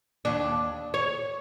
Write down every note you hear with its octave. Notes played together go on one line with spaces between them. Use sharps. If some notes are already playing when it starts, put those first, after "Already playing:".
D#2 D4
C#5